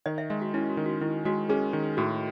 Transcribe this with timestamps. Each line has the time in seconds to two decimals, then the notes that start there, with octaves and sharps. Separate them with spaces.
0.06 D#3 D#5
0.18 E5
0.30 G#3 E5
0.42 F#4
0.54 C#4 E4
0.70 F#4
0.77 D#3
0.86 F#4
1.01 D#3 E4
1.25 G#3 F#4
1.49 C#4 G#4
1.73 D#3
1.97 A2 F#4